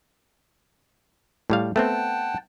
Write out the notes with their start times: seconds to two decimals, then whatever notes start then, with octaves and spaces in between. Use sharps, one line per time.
1.50 A2 G3 F5
1.76 A3 B3 C4 F#5 G5 A5